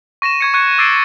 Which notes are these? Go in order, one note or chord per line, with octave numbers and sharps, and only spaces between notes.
C#6 A#6 D#7 E7
C#6 G#6 C#7
C#6 F#6 G#6 C#7
D6 E6 A6 C7 D7